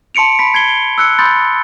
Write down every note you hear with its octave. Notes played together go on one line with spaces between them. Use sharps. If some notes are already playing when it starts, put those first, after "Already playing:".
A5 C6 C#7 D7 F7
B5 B6
G#6 C7 G7
E6 F#6 C#7
B5 C6 D#6 G6 A6